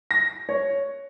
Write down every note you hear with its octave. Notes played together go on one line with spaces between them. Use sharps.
A#6
C#5